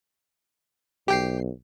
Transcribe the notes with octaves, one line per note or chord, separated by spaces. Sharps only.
B1 G4 G5 C7